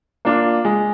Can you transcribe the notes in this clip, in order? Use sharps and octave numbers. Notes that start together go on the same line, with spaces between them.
A#3 D4 F4
G#3